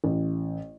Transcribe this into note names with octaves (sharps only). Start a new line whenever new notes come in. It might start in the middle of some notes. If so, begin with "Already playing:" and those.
A1